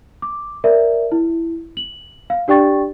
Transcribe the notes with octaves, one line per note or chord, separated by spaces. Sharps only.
D6
A#4 D5 E5
E4
F#7
F5
D4 G4 D5 G5 C#6 A6